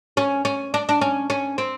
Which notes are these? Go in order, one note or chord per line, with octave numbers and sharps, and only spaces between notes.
C#4
C#4
D4
D4
C#4
C#4
C4